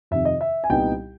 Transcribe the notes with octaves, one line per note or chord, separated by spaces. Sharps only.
F2 C3 D#3 E5
D#5
E5
G#5
C2 A#2 G3 B3 D#4 G5